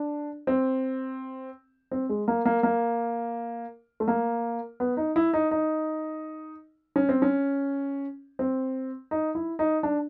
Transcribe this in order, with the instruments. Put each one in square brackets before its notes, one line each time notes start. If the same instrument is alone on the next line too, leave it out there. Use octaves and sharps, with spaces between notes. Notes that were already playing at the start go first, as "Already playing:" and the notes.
Already playing: [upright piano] D4
C4
C4
G#3
A#3
A#3
A#3
A3
A#3
B3
D#4
E4
D#4
D#4
C#4
C4
C#4
C4
D#4
E4
D#4
D4